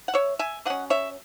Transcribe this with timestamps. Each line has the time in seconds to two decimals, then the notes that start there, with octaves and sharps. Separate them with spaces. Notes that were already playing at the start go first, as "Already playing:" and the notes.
0.08 F#5
0.14 C#5 E5
0.39 E5 G#5
0.65 F#3 C#4 D#5 F#5
0.90 C#5 E5